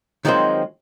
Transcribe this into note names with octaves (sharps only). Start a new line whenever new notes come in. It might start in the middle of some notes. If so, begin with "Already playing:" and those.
D#3 F3 F#3 G#3 C4 C5